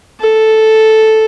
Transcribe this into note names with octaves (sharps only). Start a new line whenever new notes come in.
A4